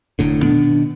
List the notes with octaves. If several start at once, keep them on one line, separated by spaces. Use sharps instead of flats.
F1 A2 D3
B2 D#3 B3 D4